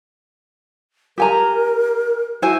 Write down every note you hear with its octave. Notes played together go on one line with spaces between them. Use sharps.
G4 A#4 G#5 A#5
E4 F#4 C5 G#5